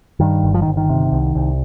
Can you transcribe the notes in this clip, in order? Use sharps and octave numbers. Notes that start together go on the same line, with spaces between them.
G2 D#3
G1
F3
D#3
G1
D#3
C3
C2
C2